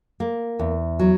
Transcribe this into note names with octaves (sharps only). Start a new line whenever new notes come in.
A#3
E2
F#3